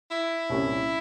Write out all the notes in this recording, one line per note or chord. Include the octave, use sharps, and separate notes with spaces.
E4
C2 A#2 G3 C#4